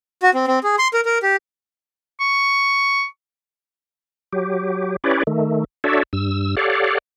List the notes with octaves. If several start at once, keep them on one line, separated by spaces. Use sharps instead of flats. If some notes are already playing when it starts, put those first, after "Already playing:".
F#4
C4
C4
G#4
C6
A#4
A#4
G4
C#6
F#3 G4
C#4 E4 G4 B4 C#5 D5
D#3 A3
D4 F#4 A4 C#5 D5 E5
G2 E6
G4 A4 C#5 D5 F5 F#5